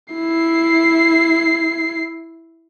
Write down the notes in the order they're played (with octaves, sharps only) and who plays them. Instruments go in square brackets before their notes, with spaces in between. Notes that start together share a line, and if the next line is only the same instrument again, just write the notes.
[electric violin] E4 C7